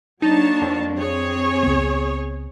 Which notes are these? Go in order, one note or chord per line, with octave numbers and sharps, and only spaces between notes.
F#3 A#3 D4 D#4 C#5 A5
F2
C4 G#4 C#5
C#2 B3